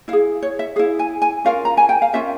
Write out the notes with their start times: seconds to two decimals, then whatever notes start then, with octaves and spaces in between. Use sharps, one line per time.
0.08 E4 F5
0.13 G#4
0.42 C#5
0.59 E5
0.76 G#4 F5
0.79 E4
0.99 G#5
1.22 G#5
1.44 C#4 F4 A#4 F5
1.65 A#5
1.77 G#5
1.89 G5
2.02 F5
2.13 C#4 F4 A#4 E5